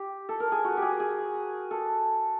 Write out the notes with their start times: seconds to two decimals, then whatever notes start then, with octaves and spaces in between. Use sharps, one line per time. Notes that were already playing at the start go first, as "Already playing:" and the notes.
Already playing: G4
0.29 A4
0.40 A#4
0.52 G#4
0.64 F#4
0.77 G4 G#4
1.00 G#4
1.71 A4